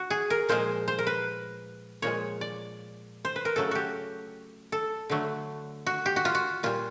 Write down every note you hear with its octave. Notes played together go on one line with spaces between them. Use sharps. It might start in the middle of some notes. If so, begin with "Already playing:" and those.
Already playing: F#4
G#4
A#4
A#2 F3 G#3 C5
C5
A#4
B4
A#2 F3 G#3 C#5
D5
C5
B4
A#4
C#3 F#3 A3 A4
F#4 G4
A4
D3 F#3 A3
F#4
G4
F#4
F4
F#4
A#2 G3 F4